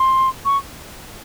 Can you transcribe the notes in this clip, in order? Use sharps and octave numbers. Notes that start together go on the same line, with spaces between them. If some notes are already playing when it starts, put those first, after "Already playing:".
Already playing: C6
C#6